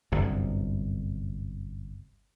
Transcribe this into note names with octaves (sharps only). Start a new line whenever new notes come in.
G1 C2 F#2